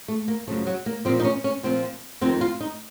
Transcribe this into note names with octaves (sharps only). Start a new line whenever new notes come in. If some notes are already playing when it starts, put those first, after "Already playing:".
A3
A#3
F#2 C#3 F3 A3
F#3
A#3
A#2 F3 C4
D#4
C#4
C#4
A#2 F3 C4
F2 D#3 C4
F4
D#4